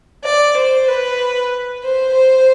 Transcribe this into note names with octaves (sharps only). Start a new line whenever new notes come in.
D5
C5
B4
C5
C5